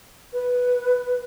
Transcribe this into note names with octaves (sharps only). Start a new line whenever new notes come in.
B4